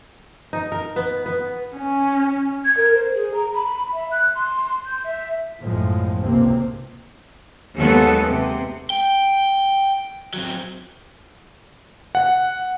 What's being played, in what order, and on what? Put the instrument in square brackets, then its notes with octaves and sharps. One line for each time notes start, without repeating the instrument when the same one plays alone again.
[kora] D#4
A#4
B3
B3
[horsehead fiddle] C#4
[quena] G#6
A#4
C5
G#4
A#5
B5
E5
F#6
C6
G6
E5
[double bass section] B1 F#2 A2 F3 G#3
G#1 C#2 C3 A#3 C4
[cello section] D#2 F#3 G#3 B3 A4
C3
[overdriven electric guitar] G5
F#3 C4
[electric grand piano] F#5